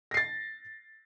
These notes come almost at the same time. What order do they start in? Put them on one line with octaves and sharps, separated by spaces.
A#6 C7 A6